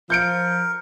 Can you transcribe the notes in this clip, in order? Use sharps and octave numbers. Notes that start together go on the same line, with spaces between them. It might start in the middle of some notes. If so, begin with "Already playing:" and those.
F3 A#4 G6 C#7 D7